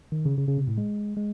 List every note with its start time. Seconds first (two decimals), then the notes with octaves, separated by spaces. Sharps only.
0.12 D#3
0.25 C#3
0.38 C#3
0.48 C#3
0.58 C3
0.68 A2
0.78 G#3
1.17 G#3